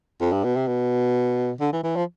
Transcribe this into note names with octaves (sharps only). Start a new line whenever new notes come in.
F2
G2
B2
C3
B2
D3
E3
E3
F3